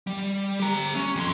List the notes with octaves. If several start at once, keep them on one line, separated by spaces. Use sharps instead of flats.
G3
G4 A#5
C#4
F2 C6